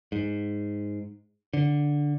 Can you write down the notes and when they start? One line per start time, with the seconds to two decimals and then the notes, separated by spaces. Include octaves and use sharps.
0.12 G#2
1.53 D3